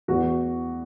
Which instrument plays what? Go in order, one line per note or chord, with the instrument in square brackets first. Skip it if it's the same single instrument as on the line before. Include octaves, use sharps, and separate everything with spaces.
[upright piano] E2 F#4